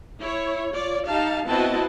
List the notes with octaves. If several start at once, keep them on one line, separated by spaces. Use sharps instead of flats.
E4 C#5
F4 C#5 D5
D#4 G4 F5 A5
B3 C4 E4 F#4 D#5 A5